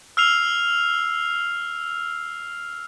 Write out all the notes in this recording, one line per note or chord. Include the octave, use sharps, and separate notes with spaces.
E6 F6 C7 F7